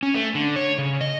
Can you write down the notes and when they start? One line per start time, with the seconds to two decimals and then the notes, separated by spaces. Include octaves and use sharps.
0.03 C#4
0.14 A3
0.35 D3
0.56 C#5
0.78 C#3
1.01 D#5